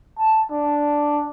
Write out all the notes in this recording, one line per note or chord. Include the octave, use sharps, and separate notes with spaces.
A5
D4